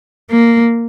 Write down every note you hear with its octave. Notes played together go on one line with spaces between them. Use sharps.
A#3